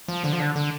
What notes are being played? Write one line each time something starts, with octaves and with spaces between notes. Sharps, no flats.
F3
D3
F3
D3
D3